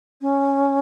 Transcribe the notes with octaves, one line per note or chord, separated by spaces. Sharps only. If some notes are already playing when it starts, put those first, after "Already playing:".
C#4